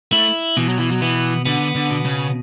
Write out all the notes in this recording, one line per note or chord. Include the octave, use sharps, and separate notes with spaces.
A3 E4
B2 E3
F#3
E3
F#3
E3 B3
D3 B3
D3
B2
C#3